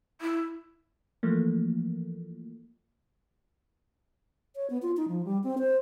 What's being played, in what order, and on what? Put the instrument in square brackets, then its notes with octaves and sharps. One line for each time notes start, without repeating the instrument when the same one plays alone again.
[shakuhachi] E4
[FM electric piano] E3 F3 A3 A#3
[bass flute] C#5
B3
F4
D#4
F3
G3
C4
C5